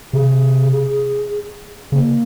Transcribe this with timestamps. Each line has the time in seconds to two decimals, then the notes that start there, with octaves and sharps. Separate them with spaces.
0.13 C3 G#4
1.92 C#3 A#3